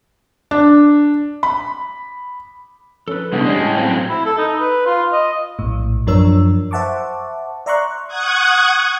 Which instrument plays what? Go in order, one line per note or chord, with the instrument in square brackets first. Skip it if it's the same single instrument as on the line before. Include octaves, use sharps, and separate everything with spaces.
[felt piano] D4
B5
[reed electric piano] F3 C#4 [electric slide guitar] A4 B4
[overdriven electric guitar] C2 B2 [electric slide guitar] G3 D4 G#4 [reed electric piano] F#5 A5
[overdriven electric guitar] G#3 C#4 [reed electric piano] A3 G4 D5
[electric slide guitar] A2 [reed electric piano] G5 A5 G#6
[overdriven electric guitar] F#3 C4 [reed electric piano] F5 G5
[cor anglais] E4
A4
D#4
B4
F4
D#5
[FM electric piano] A#1 A2
F#2 F3 D4 A#4 C#5 E6
C5 E5 F#5 A5 C#6 D6
D5 E5 A#5 C6 C#6 F#6
[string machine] F#5 C#6 D#6 F#6 G#6